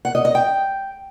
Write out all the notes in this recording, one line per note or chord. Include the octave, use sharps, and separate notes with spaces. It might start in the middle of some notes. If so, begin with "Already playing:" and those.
F#5
D#5
D#5
G5